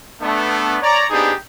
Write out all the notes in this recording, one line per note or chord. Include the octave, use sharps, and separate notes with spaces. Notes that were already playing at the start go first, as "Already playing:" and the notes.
A3 B3 D4
C#5 D5 A#5
B3 C4 D4 D#4 G4 G#4